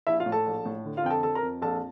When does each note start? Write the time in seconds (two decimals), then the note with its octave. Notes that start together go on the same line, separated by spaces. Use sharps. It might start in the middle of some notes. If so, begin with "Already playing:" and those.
0.07 A#1 E4 E5
0.20 F4 F5
0.26 A2
0.32 A4 A5
0.46 A#1
0.66 A2
0.85 D3
0.97 F4 F5
1.04 F2 G5
1.10 A4 A5
1.23 F2 A4 A5
1.35 A#4 A#5
1.43 F2
1.62 A#1 A4 A5